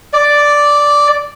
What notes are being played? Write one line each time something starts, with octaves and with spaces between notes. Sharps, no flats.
D5